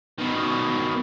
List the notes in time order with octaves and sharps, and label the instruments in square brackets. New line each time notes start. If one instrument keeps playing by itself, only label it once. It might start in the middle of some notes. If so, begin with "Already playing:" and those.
[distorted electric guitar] B2 D#3